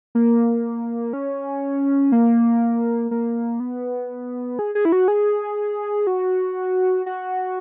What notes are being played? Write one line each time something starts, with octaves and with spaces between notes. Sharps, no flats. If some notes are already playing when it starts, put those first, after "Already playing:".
A#3
C#4
A#3
A#3
B3
G#4
G#4
E4
F#4
G#4
F#4
F#4